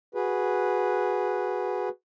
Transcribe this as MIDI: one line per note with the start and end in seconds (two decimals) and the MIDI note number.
0.15 1.89 66
0.15 1.89 68
0.15 1.89 71